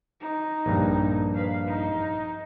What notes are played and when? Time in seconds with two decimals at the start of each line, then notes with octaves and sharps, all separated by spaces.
0.20 D#4
0.66 A#1 G2
1.35 B4 F5
1.66 D#4